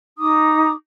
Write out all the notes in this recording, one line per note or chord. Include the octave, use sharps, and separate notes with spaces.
D#4 A#5 D6 D#6